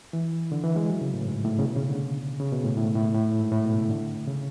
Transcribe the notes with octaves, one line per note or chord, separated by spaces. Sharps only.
E3
D3
E3
G#3
F#3
C#3
A2
G#2
A2
C#3
B2
C#3
D3
C#3
B2
A2
A2
A2
A2
G#2
A2
B2
C#3
D3
C#3